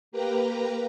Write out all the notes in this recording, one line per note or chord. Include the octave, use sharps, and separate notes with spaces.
A#3 G4 B4 A#5